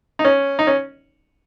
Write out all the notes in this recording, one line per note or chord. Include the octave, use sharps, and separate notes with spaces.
D#4
C#4
D#4
C#4